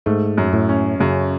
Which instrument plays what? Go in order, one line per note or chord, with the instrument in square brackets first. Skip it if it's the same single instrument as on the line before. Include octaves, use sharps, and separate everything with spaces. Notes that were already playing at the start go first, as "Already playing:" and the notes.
[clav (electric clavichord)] G#2 [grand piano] A3
[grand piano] F#2
[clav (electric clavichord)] A2
[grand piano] C#4
[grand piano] F#2 [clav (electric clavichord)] C#3